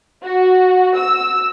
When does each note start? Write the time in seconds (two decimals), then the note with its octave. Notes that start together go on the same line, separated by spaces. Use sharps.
0.23 F#4
0.96 E6